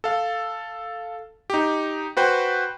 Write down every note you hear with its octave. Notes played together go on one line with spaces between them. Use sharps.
A4 F5
D#4 G4
F#4 B4 C5 G5